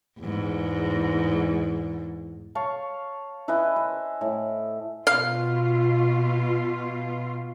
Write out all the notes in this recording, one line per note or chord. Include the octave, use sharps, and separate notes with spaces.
E2 G#2
C#5 F5 A5
E4 B4 D#5 G#5
C5
A2
B2 F4 F5